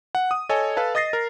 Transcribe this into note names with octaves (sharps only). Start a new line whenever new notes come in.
F#5
D#6
A4 C#5 D#5 G#5
A4 B4 F5 A5
D#5 D#6 A6 A#6 C7
A#4